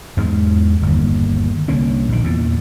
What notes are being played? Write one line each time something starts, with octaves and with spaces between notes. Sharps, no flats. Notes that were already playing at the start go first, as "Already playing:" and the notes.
E2 G#2 G#3
G1 D#2
C2 D3 A#3 C#4
A#1 D#3
E2 A#2